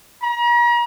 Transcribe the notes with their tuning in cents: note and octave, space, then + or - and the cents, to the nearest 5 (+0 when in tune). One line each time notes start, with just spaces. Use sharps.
A#5 +40